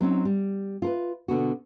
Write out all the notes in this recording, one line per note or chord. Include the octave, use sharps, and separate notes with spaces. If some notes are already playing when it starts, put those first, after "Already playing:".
F#3 C4 C#4 D#4
G3
F4 A#4 B4
B2 D3 B3 F#4